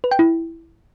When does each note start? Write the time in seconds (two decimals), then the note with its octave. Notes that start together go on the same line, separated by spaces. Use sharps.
0.04 B4
0.11 G5
0.19 E4